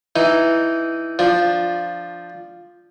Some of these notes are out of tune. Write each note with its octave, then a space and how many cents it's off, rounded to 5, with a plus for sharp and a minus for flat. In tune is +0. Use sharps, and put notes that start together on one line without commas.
E3 +0 D#4 +0
F3 +0 D4 +0